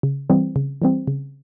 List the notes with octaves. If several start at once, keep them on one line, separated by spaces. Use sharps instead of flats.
C#3
E3 G3 C4
C#3
E3 G3 C4
C#3